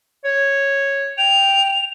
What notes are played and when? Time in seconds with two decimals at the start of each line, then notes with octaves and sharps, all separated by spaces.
0.25 C#5
1.18 G5 F7